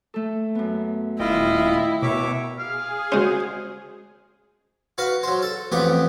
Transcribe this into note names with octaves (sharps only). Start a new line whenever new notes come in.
A3 A4
F#2 B3
D#1 E4 F4 D#5 G5
B2 A#4 C#5 E5 D6
G#4 F5
G#3 C#4 F#4 C5
F#4 B4 F5
F#3 C5
A4
A1 F2 B3 G4 B4